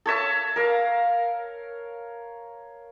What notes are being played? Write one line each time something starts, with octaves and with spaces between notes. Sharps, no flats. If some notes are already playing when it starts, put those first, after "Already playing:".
A4 C#5 E5 A5
A#4 F5